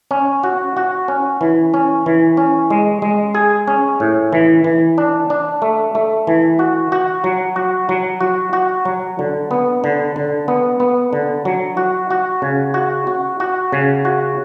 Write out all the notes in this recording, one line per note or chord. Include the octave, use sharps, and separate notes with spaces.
C#4
F#4
F#4
C#4
E3
C#4
E3
C#4
G#3
G#3
G#4
C#4
A2
E3
E3
D4
D4
A3
A3
E3
F#4
F#4
F#3
F#4
F#3
F#4
F#4
F#3
D3
B3
D3
D3
B3
B3
D3
F#3
F#4
F#4
C#3
F#4
F#4
F#4
C#3
F#4